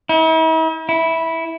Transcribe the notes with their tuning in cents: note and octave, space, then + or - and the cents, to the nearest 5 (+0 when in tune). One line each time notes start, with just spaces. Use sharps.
E4 -45
E4 -10